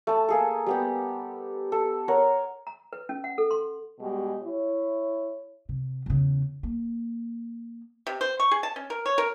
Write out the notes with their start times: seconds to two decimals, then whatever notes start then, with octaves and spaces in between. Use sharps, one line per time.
0.07 A3 A5
0.29 A#3 G#4 A4
0.66 G3 B3 G4
1.72 A4
2.08 A#4 C#5 F#5
2.67 A#5
2.93 B4
3.09 C#4
3.24 F#5
3.38 A4
3.51 C6
4.00 B2 G3 G#3 G4
4.43 E4 C#5
5.69 C3
6.06 E2 C#3
6.63 A#3
8.07 C3
8.21 C5
8.40 C#6
8.51 G#4
8.63 A5
8.76 C#4
8.90 A#4
9.06 C#5
9.18 A#4